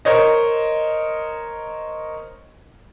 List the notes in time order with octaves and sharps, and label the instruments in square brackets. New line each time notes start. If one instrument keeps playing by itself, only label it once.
[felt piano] A#4 C5 C#5 D#5